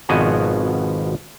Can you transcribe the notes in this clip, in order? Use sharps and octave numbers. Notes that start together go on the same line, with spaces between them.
G#1 B2 F3 B3 F#4 G#5